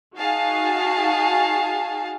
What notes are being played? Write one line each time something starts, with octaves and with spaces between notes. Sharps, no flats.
D#4 F#4 G#4 F5 A5